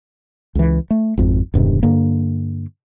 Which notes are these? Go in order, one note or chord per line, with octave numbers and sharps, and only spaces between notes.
C#2 E3
A3
G#1 F2
E1 G2 C3 D#3
G2 D3 A#3